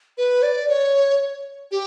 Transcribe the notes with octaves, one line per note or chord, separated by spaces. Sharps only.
B4
D5
C#5
G4